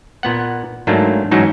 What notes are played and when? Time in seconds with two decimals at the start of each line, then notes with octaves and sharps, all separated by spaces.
0.23 A#2 B3 F#5
0.87 G#2 F#3 A3 A#3 D4
1.31 G#2 E3 F#3 C#4 D#4